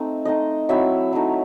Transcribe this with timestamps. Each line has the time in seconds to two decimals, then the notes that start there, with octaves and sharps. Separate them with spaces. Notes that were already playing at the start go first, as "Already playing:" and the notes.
Already playing: A3 C4 D#4
0.25 A3 C4 D#4 D#5
0.69 F#3 C4 E4 E5
1.13 F#3 A3 D#4